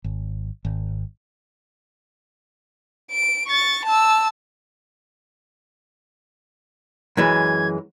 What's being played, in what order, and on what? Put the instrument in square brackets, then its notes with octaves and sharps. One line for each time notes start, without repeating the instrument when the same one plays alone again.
[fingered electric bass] G#1
G#1
[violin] D7
C#6 A6
A5 E6
[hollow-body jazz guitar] F#2 E3 G#3 [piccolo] G#6